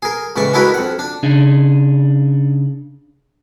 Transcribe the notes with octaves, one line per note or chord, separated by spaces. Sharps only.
G#4 A#4
C#2 A2 E3 D5 C#6
G#3 D4 E4 F#4 A#4 B4
F2 F#5
D4
C#3 D4 D#4 G#4